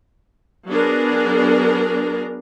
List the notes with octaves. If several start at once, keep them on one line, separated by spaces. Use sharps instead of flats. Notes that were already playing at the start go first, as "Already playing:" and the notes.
F#3 B3 D4 G#4 A#4